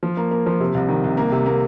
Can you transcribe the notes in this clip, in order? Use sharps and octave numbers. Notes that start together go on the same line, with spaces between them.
F3
A#3
A#3
F3
C3
C2
D#3
C2
A#3
C3
A#3